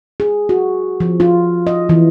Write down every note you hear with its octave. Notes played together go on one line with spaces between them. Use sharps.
G#4
F#4
F3
F4
D#5
E3